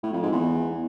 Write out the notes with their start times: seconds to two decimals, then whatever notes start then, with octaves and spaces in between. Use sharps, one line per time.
0.03 A2
0.13 F2
0.22 G#2
0.32 E2